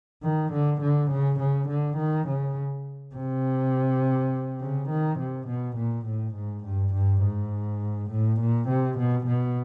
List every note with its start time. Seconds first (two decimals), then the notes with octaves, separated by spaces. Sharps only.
0.23 D#3
0.53 D3
0.81 D3
1.11 C#3
1.40 C#3
1.68 D3
1.97 D#3
2.27 C#3
3.15 C3
4.60 C#3
4.89 D#3
5.19 C3
5.47 B2
5.77 A#2
6.06 A2
6.35 G#2
6.65 G2
6.94 G2
7.23 G#2
8.10 A2
8.40 A#2
8.69 C3
8.98 B2
9.27 B2